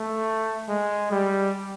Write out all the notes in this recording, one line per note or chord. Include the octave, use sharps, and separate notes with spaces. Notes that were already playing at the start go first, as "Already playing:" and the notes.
Already playing: A3
G#3
G3